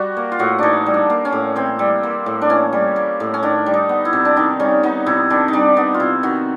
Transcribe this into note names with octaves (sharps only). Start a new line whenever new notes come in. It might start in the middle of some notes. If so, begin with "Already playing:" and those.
Already playing: G3 F#4
A#3
F4
A2 F#4
E3 D4 D#4
G3
D4
A#3
C#4
A2
E3 C4
G3
A#3
A2
D4
E3 C#4
G3
A#3
A2
C#4
D#3 D4
G3
D#4
B3
E4
C3
D4
D#3 D#4
G3 C#4
B3 D#4
C3 E4
D#3 D4
D#4
G3 D4
B3 D#4
F4
C3 E4
D#3 F#4